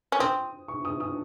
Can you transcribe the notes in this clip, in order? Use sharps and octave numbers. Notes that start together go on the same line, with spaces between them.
C#4
C4 D#6
C#6
D#6
D#6